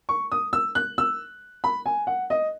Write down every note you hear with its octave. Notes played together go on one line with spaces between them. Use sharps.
C#6
D#6
E6
F#6
E6
B5
G#5
F#5
D#5